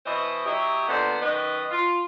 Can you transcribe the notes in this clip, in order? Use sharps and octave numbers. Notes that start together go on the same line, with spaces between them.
B2 E3 C5 D#5
F#3 E4 G4 D#5
A#2 D3 B3 C5
F#2 D#3 B4 D#5
F4